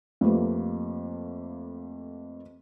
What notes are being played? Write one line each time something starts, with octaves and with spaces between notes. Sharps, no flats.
F2 A3 A#3 G4 B4